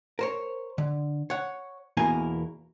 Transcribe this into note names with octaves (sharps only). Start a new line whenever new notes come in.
A#4 C5 C#5
D3
C#5 F#5
E2 B2 A#3 E4 A#4 G#5